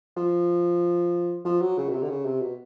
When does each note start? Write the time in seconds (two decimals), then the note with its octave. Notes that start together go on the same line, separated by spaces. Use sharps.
0.17 F3
1.45 F3
1.61 F#3
1.78 C#3
1.89 B2
1.94 C3
2.02 D3
2.10 C#3
2.26 C3
2.42 B2